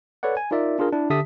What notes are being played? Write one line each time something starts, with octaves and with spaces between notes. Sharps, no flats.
A4 B4 C#5 D5 F#5
G#5
D#4 F4 A#4 D5 E5
D4 F4 G#4 A#4
D4 E4
D3 G4 E5 A5 D#6 B6